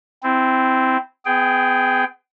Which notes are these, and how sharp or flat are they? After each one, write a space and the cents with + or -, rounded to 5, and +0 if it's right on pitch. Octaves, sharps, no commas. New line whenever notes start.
C4 -10 E4 +0
B3 +40 G#4 +0 G5 -5